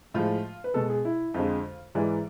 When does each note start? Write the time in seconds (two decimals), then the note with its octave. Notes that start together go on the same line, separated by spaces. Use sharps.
0.14 A2 F3 G#3 F4
0.64 B4
0.74 B2 G#3 A4
0.90 G#4
1.05 E4
1.34 F2 D3 G#3 F4
1.95 G#2 E3 G#3 D5